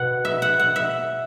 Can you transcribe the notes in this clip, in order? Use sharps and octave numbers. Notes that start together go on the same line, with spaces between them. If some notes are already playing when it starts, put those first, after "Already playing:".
Already playing: B2 F#5
E5
F#5
F#5
E5